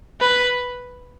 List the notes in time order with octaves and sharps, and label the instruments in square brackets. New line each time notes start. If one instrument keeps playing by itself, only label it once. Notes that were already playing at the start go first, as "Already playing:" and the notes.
[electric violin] B4